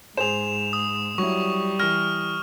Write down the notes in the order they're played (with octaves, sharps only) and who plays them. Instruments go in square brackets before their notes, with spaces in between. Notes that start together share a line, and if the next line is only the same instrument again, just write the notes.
[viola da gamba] G#2 [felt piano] G#4 C5 [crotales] E7 F7
[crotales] D#6
[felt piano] F#3 E4 [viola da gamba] G3 [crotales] C#6
[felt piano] E3 A#6 [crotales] F6